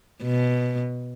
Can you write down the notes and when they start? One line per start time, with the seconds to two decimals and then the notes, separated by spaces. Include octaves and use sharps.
0.22 B2